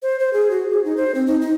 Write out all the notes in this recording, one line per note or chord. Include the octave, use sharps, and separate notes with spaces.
C5
C5
G#4
F#4
G#4
D#4
C5
C4
D#4
D#4